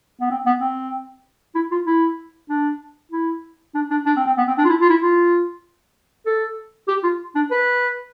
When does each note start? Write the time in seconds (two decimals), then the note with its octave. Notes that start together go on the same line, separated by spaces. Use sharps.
0.21 B3
0.30 C4
0.46 B3
0.61 C4
1.55 E4
1.71 F4
1.87 E4
2.50 D4
3.12 E4
3.75 D4
3.91 D4
4.06 D4
4.17 C4
4.27 C4
4.38 B3
4.48 C4
4.58 D4
4.65 F4
4.69 E4
4.81 F4
4.90 E4
5.01 F4
6.26 A4
6.88 G4
7.04 F4
7.36 D4
7.51 B4